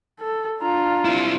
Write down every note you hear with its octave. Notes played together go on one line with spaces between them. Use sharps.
A4
D4 F4 A#5
C4 E4